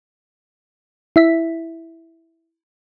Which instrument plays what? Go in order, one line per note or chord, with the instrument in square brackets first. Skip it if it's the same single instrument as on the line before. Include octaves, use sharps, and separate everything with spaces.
[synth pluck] E4 E5 B6